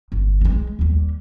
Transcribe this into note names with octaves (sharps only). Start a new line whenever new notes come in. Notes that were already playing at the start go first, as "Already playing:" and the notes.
G1
G#3 A#3
D#2 G3